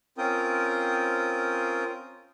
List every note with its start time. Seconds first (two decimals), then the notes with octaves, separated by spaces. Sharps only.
0.18 C4 C#4 F4 A#4 G5 D#6